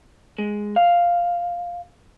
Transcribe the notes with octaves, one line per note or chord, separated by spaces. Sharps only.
G#3
F5